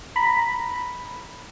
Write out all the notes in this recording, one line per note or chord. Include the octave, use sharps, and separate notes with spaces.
A#5 B5